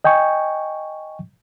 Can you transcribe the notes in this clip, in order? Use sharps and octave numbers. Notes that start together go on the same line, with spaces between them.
D#5 G5 G#5 C#6